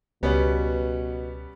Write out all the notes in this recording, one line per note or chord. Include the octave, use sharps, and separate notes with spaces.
C#2 B2 G3 B3 C#4